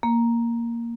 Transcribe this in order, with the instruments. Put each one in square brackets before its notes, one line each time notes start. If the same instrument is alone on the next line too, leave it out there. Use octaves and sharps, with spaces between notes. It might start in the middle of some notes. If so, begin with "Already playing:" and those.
[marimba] A#3